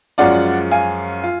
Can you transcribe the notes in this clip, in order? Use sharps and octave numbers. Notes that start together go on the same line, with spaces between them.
F#2 F3 G#3 C#4 F4 D5 F#5
F5 G#5
F4